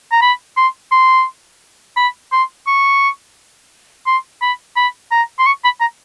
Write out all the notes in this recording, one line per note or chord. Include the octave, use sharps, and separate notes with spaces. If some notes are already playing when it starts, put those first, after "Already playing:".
A#5
B5
C6
C6
B5
C6
C#6
C6
B5
B5
A#5
C6
C#6
B5
A#5